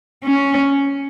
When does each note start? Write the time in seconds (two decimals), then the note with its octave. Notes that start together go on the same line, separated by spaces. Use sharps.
0.24 C#4